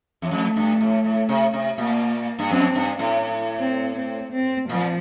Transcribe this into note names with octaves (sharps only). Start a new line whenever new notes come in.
E2
F2 A3
G2
A2
A2
C3
C3
A#2 A#3
G2
F2 C4
G2
A2
C4
C4
C4
A#2 F3